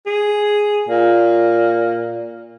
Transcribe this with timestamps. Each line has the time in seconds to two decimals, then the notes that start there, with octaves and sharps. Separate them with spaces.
0.06 G#4
0.89 A#2